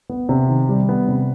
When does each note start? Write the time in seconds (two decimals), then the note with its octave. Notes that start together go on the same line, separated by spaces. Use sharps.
0.09 B3
0.29 C3
0.48 D#3
0.69 G3
0.89 B3
1.08 C3